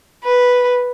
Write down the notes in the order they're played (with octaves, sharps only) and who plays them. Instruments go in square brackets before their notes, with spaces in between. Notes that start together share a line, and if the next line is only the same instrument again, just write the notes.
[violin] B4